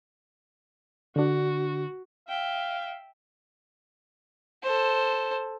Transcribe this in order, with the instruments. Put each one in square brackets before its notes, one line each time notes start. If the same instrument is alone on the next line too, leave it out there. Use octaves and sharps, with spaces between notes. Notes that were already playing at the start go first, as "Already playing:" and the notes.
[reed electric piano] D3 D4 [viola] F#4
[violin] E5 G5 [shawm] F5
[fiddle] A4 C5